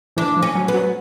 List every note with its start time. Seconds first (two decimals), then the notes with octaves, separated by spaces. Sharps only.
0.17 E3 D4
0.36 F3
0.42 C#4
0.55 F#3
0.68 B3
0.74 F#3